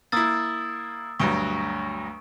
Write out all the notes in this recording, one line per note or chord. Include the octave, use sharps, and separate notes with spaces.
A#3 E4 D#6 E6 A6
D2 G2 F#3 C#6 D7